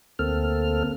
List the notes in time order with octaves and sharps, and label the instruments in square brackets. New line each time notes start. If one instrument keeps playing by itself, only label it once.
[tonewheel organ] D2 A#3 C4 A4 F6